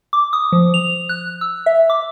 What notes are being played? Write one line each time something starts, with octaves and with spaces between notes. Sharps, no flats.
D6
D#6
F3
F7
F#6
E6
E5
D6